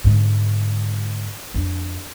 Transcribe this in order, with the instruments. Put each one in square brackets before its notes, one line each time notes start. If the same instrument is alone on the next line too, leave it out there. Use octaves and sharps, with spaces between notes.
[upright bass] G#2 D3
F2 D4